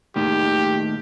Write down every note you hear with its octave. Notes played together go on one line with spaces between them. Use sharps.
D#2 A2 D#3 G4